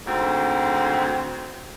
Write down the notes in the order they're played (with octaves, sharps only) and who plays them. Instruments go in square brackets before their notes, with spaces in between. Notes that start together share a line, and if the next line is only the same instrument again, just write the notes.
[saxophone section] D2 G#2 C4